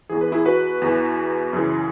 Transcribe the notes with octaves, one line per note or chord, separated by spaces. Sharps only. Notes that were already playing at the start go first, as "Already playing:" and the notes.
E2 E3 G#4
B4
E4 G#4
F#4 B4
E2 E3
F#2 C#3 E3